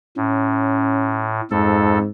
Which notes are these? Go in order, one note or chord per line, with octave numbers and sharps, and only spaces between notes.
A2 C#4
F2 G#2 A4